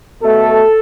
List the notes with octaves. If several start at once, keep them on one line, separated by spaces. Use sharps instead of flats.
B2 A3 A4